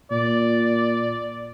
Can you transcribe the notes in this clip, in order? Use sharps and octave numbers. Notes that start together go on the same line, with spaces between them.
A#2 D5